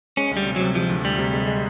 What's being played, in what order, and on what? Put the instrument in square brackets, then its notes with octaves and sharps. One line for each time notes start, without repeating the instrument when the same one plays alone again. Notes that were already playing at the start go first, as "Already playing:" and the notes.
[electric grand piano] G#3 [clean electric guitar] C#4
[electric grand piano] D2
[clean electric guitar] G3
[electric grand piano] C3
[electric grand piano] C3 [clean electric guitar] F#3
[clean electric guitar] F3 [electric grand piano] G#3
[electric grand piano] D2
[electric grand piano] D2 [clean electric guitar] G3
[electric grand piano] C3
G#3
G#3